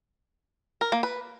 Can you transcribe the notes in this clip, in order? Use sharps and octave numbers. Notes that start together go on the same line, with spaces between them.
A#4
A#3
B4